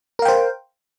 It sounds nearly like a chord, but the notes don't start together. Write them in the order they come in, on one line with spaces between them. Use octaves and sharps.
A#4 F5 G5 C5